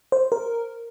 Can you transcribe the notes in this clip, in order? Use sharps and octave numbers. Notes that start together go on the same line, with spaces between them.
C5
A#4